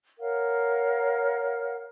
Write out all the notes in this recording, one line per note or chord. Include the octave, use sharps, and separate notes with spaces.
A#4 C#5 F5 F#5